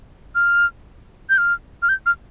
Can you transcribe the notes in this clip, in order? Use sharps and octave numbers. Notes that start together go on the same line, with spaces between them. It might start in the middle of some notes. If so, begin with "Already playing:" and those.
F6
G6
F6
F6
G6
F6